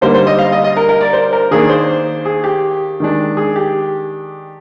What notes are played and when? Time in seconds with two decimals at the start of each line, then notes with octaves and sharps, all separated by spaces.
0.01 D3 G3 A#3 D#4 C5
0.14 C5
0.27 D#5
0.39 F5
0.52 D#5
0.64 D#5
0.77 A#4
0.89 A#4
1.01 D5
1.13 C5
1.33 A#4
1.51 D#3 A#3 D4 G#4
1.69 C5
2.25 G#4
2.44 G4
3.00 D#3 G#3 D4
3.37 G#4
3.56 G4